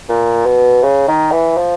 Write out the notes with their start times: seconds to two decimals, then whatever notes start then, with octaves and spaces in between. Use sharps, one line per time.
0.09 A#2
0.46 B2
0.83 C#3
1.08 D#3
1.32 E3
1.57 F3